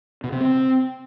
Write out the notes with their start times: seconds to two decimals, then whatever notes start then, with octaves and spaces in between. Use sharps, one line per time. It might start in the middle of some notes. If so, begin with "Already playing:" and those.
0.24 B2
0.32 C3
0.41 C4